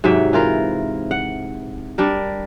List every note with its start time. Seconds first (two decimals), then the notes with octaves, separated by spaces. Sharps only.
0.04 G#2 C3 F#3 E5
0.33 E3 F4 A#4
1.11 F#5
1.98 G3 D4 A#4